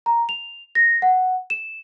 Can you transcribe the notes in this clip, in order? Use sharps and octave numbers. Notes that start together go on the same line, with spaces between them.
A#5
F7
A#6
F#5
E7